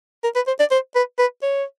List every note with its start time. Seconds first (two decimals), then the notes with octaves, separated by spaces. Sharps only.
0.24 A#4
0.36 B4
0.47 C5
0.60 D5
0.71 C5
0.95 B4
1.19 B4
1.42 C#5